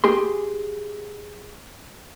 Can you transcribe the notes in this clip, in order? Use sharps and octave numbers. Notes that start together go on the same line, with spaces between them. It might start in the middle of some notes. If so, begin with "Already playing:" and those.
G4 G#4 C6